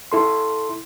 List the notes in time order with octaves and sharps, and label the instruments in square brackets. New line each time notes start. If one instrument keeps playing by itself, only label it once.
[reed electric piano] E4 A4 C6